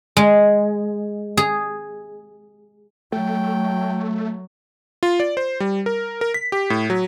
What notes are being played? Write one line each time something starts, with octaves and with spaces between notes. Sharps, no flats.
G#3
G#4
F#3 A3 G5
F4
D5
C5
G3
A#4
A#4
B6
G4
A2
F#3